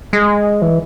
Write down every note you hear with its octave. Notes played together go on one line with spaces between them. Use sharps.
G#3
E3